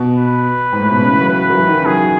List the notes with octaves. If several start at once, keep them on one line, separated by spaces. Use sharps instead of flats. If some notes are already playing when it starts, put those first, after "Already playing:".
Already playing: B2
B4
G#2
A2
B2
C#3
E3
F#3
B4
F#3
E3
D#3
C#3
F#3 G#4